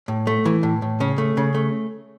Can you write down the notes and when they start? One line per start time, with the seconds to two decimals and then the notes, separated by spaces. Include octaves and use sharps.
0.08 A2
0.27 A3
0.45 E3
0.63 A2
0.82 A2
1.00 C#3 C#4
1.18 A3
1.37 C#3
1.55 A3